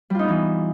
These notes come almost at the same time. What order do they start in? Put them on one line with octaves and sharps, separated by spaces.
G3 F4 D#4 B3 E3